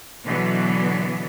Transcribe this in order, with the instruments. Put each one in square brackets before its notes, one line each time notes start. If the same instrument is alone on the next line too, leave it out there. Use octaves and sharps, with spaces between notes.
[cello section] B2 D3 E3 F#3 B3